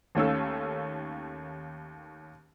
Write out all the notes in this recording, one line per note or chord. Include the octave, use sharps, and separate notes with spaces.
D#2 D#3 A3 C#4 F5 E6